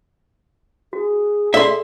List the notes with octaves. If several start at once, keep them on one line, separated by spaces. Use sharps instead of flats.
F#4 G#4
A4 D5 E5 C6 E6